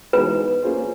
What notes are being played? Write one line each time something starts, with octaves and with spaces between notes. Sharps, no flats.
E3 G#3 B3 D#4 F#4 B4
A#3 C#4 F4 G#4 C5